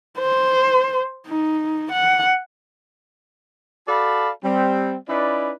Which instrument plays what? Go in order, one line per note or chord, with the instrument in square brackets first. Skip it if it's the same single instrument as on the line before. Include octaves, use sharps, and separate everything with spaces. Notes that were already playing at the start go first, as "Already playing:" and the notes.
[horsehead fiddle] C5
D#4
F#5
[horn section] F#4 A4 D5 F5 A5 B5
G3 C4
C#4 D#4 E4 B4 D5